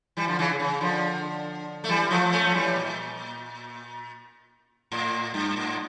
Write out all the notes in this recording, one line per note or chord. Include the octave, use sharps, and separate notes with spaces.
E3 G3
D3 F3
C#3 E3
C#3
C#3
D3 F3
A3
E3 G3
F3 A3
A3 C#4
F3
E3 G3
A#2
A2
G2
A2